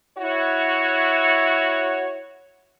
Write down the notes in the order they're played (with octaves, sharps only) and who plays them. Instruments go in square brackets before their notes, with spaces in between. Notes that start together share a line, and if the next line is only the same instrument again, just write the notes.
[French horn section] E4 F#4 C#5